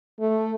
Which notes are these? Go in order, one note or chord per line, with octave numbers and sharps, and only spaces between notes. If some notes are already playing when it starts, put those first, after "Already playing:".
A3